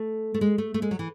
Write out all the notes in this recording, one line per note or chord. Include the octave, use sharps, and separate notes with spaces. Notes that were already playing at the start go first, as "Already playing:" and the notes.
Already playing: A3
A3
G#3
A3
A3
G#3
F#3
E3